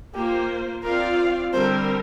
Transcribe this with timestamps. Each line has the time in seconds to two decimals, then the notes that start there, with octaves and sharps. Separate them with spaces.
0.14 A#3 F4 G4 C5
0.83 C4 F4 A#4 D5 F5
1.53 D3 G3 C4 A#4 C5